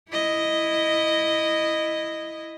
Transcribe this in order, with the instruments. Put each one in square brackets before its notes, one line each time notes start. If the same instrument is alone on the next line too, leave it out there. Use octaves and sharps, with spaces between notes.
[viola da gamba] E4 D#5